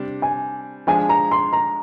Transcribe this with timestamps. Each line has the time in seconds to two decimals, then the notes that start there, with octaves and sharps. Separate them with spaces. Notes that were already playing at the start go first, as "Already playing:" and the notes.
Already playing: C3 G3 D4
0.22 G#5
0.87 F3 G#3 D4 G#5
1.09 A#5
1.31 C6
1.53 A#5